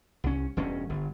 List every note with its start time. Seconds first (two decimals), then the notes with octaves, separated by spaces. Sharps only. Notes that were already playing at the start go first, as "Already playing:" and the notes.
0.24 C2 C#4
0.57 E1 G2 C#4
0.90 G1